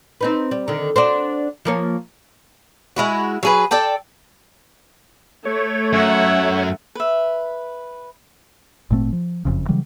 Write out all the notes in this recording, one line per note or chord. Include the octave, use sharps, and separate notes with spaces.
C4 D#4 B4
G3
D3 D#3
D4 F#4 C5
F3 A#3 C#5
G#3 E4 F#4
F#3 G#4 B4
A4 D5 G5 A5
A3 C#5
F#2 E5 F#5
B4 E5
G#1 A#2 A3 C4
F3
F#1 F2 C#3
C#3 E3 F#3 G3